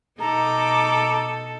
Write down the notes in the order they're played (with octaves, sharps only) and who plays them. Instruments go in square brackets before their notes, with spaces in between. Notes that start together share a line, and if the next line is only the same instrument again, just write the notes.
[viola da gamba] B2 D#4 A4 [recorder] A#5 [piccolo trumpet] D6